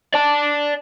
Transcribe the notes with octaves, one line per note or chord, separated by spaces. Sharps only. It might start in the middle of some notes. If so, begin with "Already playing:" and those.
D5 A5